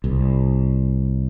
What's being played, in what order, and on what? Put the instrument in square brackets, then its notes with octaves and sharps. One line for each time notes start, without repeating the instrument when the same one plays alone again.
[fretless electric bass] C2